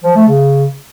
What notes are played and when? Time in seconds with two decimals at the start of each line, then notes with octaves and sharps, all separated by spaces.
0.03 F3
0.15 A3
0.27 C#3